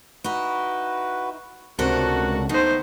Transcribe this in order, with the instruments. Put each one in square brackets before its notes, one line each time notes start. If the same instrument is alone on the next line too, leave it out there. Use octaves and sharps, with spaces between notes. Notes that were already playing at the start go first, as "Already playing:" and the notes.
[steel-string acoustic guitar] D#4 E4 [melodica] F#4 B4
[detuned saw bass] C#2 [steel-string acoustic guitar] C3 A4 A#4 [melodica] A3 D4 F#5 [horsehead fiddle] F#4
[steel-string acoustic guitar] D#3 B3 [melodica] A3 [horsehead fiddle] D#4 C5